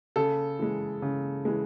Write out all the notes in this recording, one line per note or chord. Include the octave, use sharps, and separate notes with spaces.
C#3 A4
E3 G#3
C#3
E3 G#3